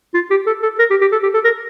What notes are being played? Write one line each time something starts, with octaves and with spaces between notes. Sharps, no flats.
F4
G4
A4
A4
A#4
G4
G4
A4
G4
A4
A#4